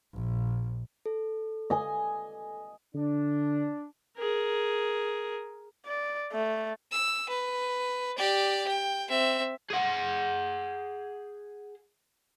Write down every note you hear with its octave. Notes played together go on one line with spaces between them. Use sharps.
A#1
A4
D#5 G#5
D3 D4
G#4 A#4
D5
A3
E6
B4
G4 D5
G5
C4 E5
G#4 F#5